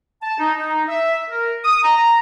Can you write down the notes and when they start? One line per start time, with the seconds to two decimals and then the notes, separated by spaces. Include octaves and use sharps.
0.22 A5
0.39 D#4
0.57 D#4
0.88 E5
1.30 A#4
1.65 D#6
1.84 A#5